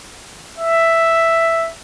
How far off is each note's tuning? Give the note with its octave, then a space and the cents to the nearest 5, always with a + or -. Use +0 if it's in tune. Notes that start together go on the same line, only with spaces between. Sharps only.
E5 +5